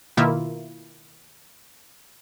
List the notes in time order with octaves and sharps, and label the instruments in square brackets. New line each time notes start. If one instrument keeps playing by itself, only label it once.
[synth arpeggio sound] B2 D#3 A#3 E4 F4